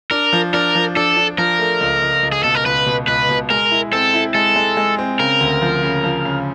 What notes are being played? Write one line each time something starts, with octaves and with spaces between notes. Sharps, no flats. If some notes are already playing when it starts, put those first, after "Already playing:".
D4 A#4
F3
D4 A#4
F3
D4 A4
D4
F3 A#4
A3
C#2
C#2
C#2
G#4
B2 A4
A#4
C#2 B4
B2
C#2 B4
B2
G#3 A#4
E4
C4 A4
E4
G#3 A4
G#3
G#3
C4
C#3 A#4
D2
F3
C#3
F3
C#3